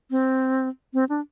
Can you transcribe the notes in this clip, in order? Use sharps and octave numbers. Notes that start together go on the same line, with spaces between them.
C4
C4
D4